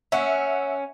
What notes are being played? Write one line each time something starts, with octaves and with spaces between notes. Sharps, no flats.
C#4 E5 F#5